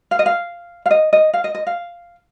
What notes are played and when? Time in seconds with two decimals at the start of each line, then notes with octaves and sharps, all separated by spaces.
0.11 F5
0.19 D#5
0.26 F5
0.86 F5
0.91 D#5
1.13 D#5
1.33 F5
1.44 D#5
1.55 D#5
1.67 F5